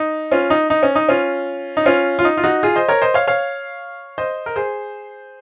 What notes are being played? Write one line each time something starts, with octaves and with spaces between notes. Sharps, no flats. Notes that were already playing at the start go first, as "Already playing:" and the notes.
Already playing: D#4
C#4 F4
D#4
D#4
C#4
D#4
C#4 F4
D#4
C#4 F4
F4
D#4
F4
D#4 F#4
F4 G#4
C5 D#5
A#4 C#5
C5 D#5
C#5 F5
C#5 F5
C5 D#5
A#4
G#4 C5